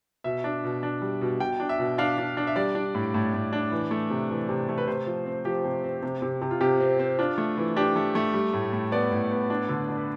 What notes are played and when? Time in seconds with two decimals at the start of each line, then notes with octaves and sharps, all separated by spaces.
0.24 B2 E5
0.44 D4
0.64 B2
0.83 D4
1.02 G3
1.21 B2
1.40 B2 G5
1.60 D4
1.69 E5
1.79 B2
1.98 D4 F5
2.18 D4
2.37 D4
2.47 E5
2.56 G3 D5
2.75 D4
2.95 A2
3.14 A2
3.34 A2
3.53 D4
3.72 E3
3.91 A3
4.10 C3
4.30 E3
4.49 C3
4.69 A3
4.78 B4
4.87 C3 C5
5.07 F3
5.26 C4
5.45 F3 G4
5.64 C3
5.84 C4
6.03 C3
6.22 C3
6.42 C3
6.51 F4
6.61 C3 G4
6.80 C4
6.99 C4
7.19 D4 F4
7.38 A3
7.57 E3
7.76 D4 G4
7.96 A3
8.15 A3
8.34 G3
8.53 A2
8.73 A2
8.92 B3 D5
9.12 A2
9.31 B3
9.50 D4
9.69 D3
9.89 D4
9.97 B4